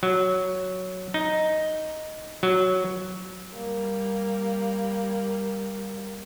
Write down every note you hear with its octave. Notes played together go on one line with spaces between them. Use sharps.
F#3
D#4
F#3
G3 A#3